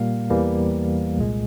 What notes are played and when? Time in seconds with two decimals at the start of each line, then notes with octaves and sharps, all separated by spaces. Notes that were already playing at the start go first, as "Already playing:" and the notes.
Already playing: A#2 G3 A#3 F5
0.30 E2 E3 G3 A#3
1.17 C2 A#2 G#3